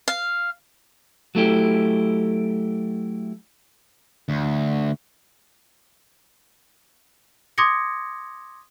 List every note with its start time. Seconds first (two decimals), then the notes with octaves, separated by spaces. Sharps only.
0.08 F5
1.35 F#3 A3 E4 G4
4.29 D2
7.58 C6 D6 D#6 G#6 A#6 C#7